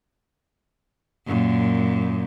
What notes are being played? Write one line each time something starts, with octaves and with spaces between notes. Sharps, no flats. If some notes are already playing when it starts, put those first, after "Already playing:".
F#2 A#2